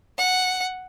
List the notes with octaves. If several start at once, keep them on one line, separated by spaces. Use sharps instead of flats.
F#5